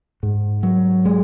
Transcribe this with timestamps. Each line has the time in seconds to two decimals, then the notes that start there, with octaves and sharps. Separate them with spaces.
0.23 G#2
0.63 F#3
1.05 G#3